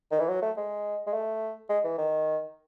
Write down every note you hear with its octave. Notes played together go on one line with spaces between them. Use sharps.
D#3
E3
F#3
A3
G#3
G#3
A3
G#3
E3
D#3